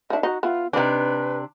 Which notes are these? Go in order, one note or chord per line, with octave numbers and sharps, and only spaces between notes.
D#3 D4 E5
D#4 F#4
B3 E4 F4
C3 C4 D4 D#4 B4